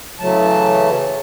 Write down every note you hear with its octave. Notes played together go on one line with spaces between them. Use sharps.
C#3 E3 F#3 A3 A5